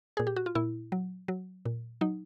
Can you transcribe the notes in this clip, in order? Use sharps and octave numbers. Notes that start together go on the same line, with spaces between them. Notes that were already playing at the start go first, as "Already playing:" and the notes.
A#2 G#4
G4
F#4
F4
A#2 E4
F#3
F#3
A#2
F#3 D#4